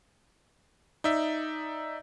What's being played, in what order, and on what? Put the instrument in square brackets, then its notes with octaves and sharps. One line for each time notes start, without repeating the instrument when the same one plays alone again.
[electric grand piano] D#4 D5 E5